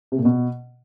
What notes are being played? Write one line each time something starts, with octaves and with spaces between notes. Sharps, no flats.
C3
A#2
B2